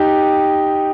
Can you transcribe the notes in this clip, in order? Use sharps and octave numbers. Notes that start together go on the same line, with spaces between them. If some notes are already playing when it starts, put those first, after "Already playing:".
Already playing: D#4 G4